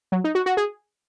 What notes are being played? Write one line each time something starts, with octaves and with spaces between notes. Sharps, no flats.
F#3
D#4
F#4
F#4
G#4